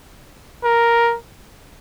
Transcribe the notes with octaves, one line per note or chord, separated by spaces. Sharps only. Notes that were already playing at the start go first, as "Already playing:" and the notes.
A#4